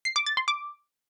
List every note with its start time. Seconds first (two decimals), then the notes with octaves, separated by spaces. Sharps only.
0.05 C7
0.16 D6
0.26 A6
0.37 C6
0.48 D6